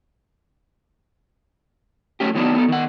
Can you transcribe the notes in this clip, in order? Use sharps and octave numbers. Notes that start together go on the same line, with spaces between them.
F#3 A3 C#4 G4
D#3 F#3 B3 D4 D#4
B3 A4
D#3 F#5